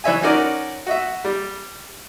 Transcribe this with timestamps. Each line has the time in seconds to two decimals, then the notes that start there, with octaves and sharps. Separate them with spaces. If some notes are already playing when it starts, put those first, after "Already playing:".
0.04 E3 C#5 E5 G#5
0.22 C#4 D#4 F#4 A#4 D5
0.86 F#4 D#5 E5
1.25 G3